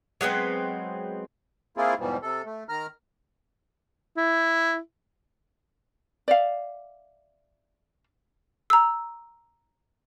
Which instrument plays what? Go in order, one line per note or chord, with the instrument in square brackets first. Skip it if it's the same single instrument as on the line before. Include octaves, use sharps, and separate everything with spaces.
[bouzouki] F#3 G#3 B3 C4
[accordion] A#3 C4 E4 F4 G#4
E2 G#2 B2 E3 F3 G3
C3 A4
A3
D#3 A#5 F6
[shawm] E4
[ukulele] D5 E5 F5
[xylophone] A#5 E6